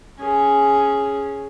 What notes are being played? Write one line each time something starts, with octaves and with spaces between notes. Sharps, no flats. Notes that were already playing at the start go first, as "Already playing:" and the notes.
C#4 G#4